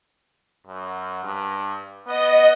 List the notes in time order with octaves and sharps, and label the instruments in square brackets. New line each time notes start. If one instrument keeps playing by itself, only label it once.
[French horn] F#2
G2
[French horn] B3 [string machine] D#5